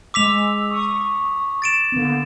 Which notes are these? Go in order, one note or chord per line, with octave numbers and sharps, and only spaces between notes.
G#3 D6 E6 B6 F7
C#6 D#6
A6 D7 E7
D3 A#3 B3